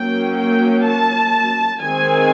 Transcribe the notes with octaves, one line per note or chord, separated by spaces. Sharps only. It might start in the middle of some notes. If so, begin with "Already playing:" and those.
Already playing: F#3 A#3 C#4 G5
G5
A5
D#3 G#3 C4 G#5